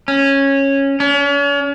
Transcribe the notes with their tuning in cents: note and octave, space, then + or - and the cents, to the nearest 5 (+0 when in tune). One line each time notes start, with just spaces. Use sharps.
C#4 -10
C#4 +40